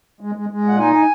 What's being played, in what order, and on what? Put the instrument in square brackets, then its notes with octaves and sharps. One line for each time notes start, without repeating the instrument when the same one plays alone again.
[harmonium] G#3
G#3
G#3
A#2 F#5
D#4 G#5
G#5